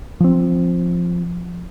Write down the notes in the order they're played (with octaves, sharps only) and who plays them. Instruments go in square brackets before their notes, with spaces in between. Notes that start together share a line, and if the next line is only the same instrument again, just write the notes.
[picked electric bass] F3 C4